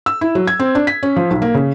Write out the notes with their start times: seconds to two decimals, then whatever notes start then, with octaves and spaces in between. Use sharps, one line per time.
0.06 E6
0.21 E4
0.35 F#3
0.47 G#6
0.60 C4
0.75 D4
0.87 B6
1.03 C#4
1.16 F3
1.30 B1
1.42 A#3
1.55 C#3